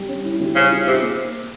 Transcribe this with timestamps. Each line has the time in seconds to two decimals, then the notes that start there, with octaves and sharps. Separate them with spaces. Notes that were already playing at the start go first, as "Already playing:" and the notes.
Already playing: G3
0.08 C#4
0.24 E4
0.40 G3
0.55 C#3 C5
0.71 F4
0.87 C3 G#4
1.02 A#3